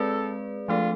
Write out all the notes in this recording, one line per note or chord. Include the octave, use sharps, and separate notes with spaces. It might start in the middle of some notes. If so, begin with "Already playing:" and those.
Already playing: G#3 C4 G#4 A4 B4 D5
F3 A3 D4 F4 A4